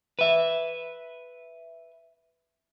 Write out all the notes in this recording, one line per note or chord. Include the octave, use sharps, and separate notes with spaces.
B4 E5